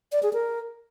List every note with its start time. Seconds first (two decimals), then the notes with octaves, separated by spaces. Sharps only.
0.12 D5
0.23 G#4
0.33 A#4